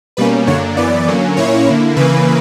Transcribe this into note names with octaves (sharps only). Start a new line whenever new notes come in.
B2 G3 A#3 C#4 B4
F#2 D3 A#3 D4 C#5
F#2 E3 B3 D5
D3 F#3 A#3 C#4
A#2 A#3 C#4 E4 C#5
D3 A#3 E4
C#3 E3 A#3 B4